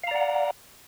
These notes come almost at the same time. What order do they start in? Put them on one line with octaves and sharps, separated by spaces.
F5 A#5 D5 F#5